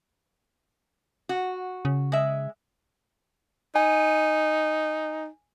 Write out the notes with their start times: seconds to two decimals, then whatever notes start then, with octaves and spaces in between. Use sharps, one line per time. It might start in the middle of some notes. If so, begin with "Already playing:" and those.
1.29 F#4
1.85 C#3
2.12 G#3 E5
3.76 D#4 G#5